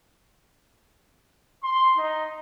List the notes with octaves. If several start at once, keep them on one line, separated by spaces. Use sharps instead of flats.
C6
D#4